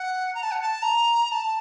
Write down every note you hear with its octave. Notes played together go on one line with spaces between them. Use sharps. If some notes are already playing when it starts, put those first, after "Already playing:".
Already playing: F#5
A#5
A5
F#5
A5
A#5
A5